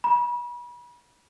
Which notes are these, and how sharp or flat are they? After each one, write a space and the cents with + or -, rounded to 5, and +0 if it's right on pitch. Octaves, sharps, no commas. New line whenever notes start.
B5 -35